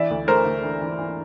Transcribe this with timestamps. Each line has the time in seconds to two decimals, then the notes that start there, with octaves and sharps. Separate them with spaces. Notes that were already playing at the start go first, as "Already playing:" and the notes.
Already playing: E3 D5 E5
0.10 D2
0.28 A3 A#4 C5
0.45 D2
0.63 E3
0.81 E3
0.99 E3